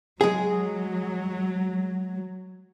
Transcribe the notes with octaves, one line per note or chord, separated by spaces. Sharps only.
F#3 G#3 G#4